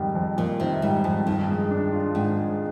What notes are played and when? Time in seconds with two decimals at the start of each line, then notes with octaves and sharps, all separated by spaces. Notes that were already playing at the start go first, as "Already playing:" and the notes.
Already playing: F2 G#2 D#3 G3
0.15 F2
0.37 F2 A#2
0.60 C3 D#3
0.82 G#2 G3
1.04 F2 G#2
1.26 G2 D#3
1.48 G#3
1.71 D4
1.92 F4
2.15 G#2 D#3
2.37 G#3